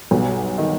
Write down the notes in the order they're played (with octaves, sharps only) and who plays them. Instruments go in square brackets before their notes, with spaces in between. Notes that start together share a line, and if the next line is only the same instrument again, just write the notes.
[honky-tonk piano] B1 B2 [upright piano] G2
[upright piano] D#3